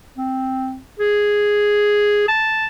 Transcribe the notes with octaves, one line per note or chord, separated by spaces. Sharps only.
C4
G#4
A5